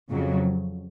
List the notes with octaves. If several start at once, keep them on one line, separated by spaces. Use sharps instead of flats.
F2 C#3 F#3